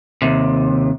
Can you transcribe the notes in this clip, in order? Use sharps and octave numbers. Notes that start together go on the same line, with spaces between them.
D#2 C3